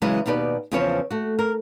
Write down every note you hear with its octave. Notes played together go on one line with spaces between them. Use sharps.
C#3 E3 F#3 G#3 E4 B4
D#2 B2 D#4 G4 B4 D5
E2 C#3 F3 C4 B4 C#5
A3 F#4
A#4